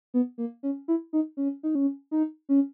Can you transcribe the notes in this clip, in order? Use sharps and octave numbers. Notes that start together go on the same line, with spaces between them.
B3
A#3
C#4
E4
D#4
C#4
D#4
C#4
D#4
C#4